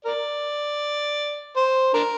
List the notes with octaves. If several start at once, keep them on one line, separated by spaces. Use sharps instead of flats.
A#4 D5
C5
D4 A#4